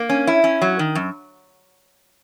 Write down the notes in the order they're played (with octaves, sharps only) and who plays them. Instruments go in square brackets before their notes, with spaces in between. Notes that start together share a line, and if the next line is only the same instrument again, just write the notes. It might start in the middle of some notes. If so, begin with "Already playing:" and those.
Already playing: [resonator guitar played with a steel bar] A#3
C#4
E4
C#4
F#3
D#3
F#2